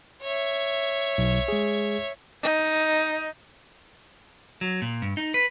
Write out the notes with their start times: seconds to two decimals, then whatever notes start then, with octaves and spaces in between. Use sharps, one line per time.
0.22 C#5 E5
1.18 B1
1.48 G#3 G#4
2.43 D#4
4.61 F#3
4.82 A#2
5.02 G2
5.17 D#4
5.34 B4